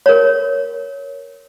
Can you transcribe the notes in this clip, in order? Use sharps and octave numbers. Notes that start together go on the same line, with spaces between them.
A#4 C#5